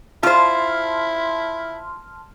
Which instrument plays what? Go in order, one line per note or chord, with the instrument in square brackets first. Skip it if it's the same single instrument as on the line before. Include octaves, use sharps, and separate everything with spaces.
[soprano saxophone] E4 [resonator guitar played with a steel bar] F4 C5 [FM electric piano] A5 C6 F6